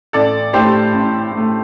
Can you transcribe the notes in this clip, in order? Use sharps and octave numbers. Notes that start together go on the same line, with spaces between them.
A1 A4 D5
A2 A3 G4 C5
A1
A2
A3